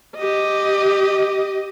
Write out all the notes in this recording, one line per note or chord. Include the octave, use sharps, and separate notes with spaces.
G4 D#5